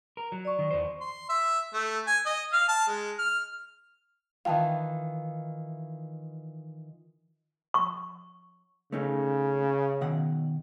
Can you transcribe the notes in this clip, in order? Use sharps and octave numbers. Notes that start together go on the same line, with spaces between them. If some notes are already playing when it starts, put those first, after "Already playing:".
A#4
F#3
D5 C#6
D#3
E2 C5
C6
E5
A3
G#5
D#5
F5
A5
G#3
F6
D#3 E3 F4 F5 G5 A5
C#6
C#3 A3 C#4 D#4
B2 D#3 F#5